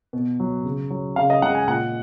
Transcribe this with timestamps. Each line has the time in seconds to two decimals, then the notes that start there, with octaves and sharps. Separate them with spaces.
0.13 B2
0.40 F#3
0.64 C#3
0.90 F#3
1.16 C#3 F5
1.30 D#5
1.42 G#3 F#5
1.55 G#5
1.68 A#2 F#5